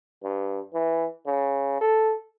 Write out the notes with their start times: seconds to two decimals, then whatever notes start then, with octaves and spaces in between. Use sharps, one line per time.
0.23 G2
0.73 E3
1.26 C#3
1.81 A4